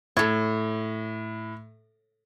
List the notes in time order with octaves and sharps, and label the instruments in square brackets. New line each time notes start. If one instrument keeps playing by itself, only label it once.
[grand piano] A2 [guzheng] A4 C#5